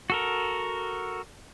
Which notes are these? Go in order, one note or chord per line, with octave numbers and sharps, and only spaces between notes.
F#4 A4 A#4